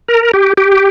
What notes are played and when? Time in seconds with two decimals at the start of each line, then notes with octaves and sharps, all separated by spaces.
0.08 A#4
0.34 G4
0.57 G4